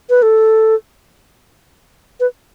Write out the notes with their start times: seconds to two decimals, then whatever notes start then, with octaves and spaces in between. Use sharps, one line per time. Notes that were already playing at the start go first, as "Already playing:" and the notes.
0.10 B4
0.22 A4
2.20 B4